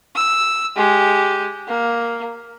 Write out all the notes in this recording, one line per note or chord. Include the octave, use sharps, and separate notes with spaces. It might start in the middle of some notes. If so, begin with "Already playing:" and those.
E6
G#3 G4
A#3